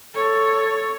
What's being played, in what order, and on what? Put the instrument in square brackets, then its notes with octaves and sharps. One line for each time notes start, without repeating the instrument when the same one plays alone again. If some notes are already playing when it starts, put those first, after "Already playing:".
[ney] A4 [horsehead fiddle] C#5